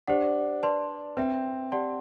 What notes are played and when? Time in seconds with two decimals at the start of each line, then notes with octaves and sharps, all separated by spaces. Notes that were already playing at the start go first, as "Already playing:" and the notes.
0.08 D4 G4 C5 F#5
0.63 B4 D5 A5 C6
1.17 C4 B4 E5 G5
1.72 G4 D5 F#5 A5 C6